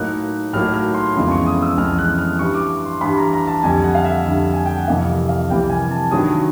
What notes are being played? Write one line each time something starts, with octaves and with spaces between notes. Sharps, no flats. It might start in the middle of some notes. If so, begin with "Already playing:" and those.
Already playing: A2 F#3 A#3 D#4 F#6
A2 F#3 A#3 D#4 F6
F6
C6
F2 C#3 E3 G#3 B3 C6
C#6
D#6
E6
F2 C#3 E3 G#3 B3 F6
F#6
F6
G2 E3 G3 C#6
D6
C6
G2 E3 G3 B5
A#5
A#5
A5
F2 D3 G3 G#5
F#5
F5
E5
F2 D3 G3
G#5
G5
F#5
F2 C3 E3 G3 A#3 F5
E5
F5
F2 C3 E3 G3 A#3 G5
G#5
A5
G2 D#3 F#3 D#6